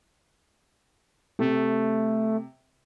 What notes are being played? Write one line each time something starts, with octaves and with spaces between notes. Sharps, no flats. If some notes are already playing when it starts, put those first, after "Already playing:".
C3 A3